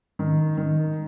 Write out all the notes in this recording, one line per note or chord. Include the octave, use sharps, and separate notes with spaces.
D#3
D#3